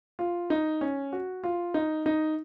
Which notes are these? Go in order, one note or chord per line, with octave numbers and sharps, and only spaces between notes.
F4
D#4
C#4
F#4
F4
D#4
D#4